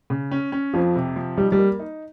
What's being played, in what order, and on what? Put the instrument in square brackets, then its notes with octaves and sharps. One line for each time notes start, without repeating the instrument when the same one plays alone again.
[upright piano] C#3
C#4
C#4
[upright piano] F2 [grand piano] F3
[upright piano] C3
F3
[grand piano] G3 [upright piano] D#4
[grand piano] G3
[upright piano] A#3
D#4